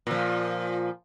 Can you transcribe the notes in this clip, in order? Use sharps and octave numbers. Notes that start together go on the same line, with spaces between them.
A#2 F3